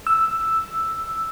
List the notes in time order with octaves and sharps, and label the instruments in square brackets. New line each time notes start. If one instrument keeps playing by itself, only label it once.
[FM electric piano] E6